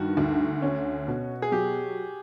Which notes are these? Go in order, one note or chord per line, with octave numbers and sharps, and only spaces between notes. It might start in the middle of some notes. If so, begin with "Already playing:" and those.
Already playing: G2 D#3 F#4
D2
C#4
B2
G#4
F#3 G4